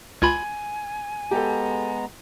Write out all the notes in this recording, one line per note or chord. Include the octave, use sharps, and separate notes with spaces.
C#2 F4 G#5 B5 G#6
G#3 B3 G4 A4 A#5